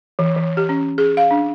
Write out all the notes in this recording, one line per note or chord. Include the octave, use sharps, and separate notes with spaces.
E3
E3
G4
C#4
G#4
F5
D4